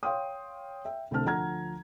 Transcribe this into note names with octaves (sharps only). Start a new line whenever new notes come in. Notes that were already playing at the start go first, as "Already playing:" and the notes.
C#5 F5 G5 C6 D#6
E5 G5
C2 D3 A3 C4 A5 F6
D2 F3 F#5 A#5 F6 G#6